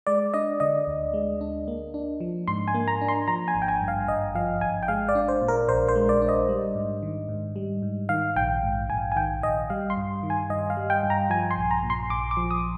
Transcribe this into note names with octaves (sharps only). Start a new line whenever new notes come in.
G#3 D5
D4 D#5
D3 D#5
D2
G#3
D4
A#3
D4
F3
G#2 C6
G#5
A#3
A#5
D4
C6
F3 A#5
G#5
G#1
G5
G#5
G2
F5
G#1 D#5
F3 F5
G#1 G#5
G5
G#3 F5
D5
D4
C5
A#2
A#4
A#1 C5
C5
G#3
D5
D4
D#5
G3
G#2
D#3
G#2
G3
G#2
D#3 F5
A#1 G5
G#2
A#1 G#5
G#5
D#3 G5
A#1 D#5
G3 F5
C6
G2
D#3
G#5
G2 D#5
F5
G3
G5
G2
A#5
F3 G#5
C6
A#1
A#5
A#2
C6
A#1 D6
D6
F3
D#6